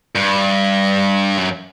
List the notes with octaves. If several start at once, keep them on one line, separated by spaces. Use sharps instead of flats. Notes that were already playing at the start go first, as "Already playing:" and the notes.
G2
F#2